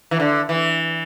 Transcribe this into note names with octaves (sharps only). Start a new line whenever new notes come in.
E3
D3
E3